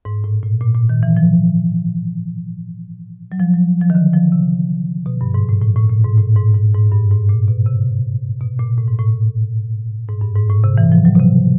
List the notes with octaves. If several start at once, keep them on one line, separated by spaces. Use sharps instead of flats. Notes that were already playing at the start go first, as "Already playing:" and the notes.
G#2
A2
A#2
A#2
A#2
D#3
E3
F3
F#3
F3
F#3
F3
D#3
D3
F3
C3
B2
G2
G#2
A2
A2
A2
A#2
G#2
A2
G#2
G#2
G#2
G2
G#2
A#2
B2
C3
B2
A#2
A2
G#2
A2
G#2
G2
G#2
A2
C3
E3
F3
F#3
B2
C3